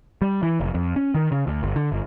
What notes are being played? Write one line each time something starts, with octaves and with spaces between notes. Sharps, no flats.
G3
E3
F1
F2
C#4
D#3
C#3
D2
G1
D3
G1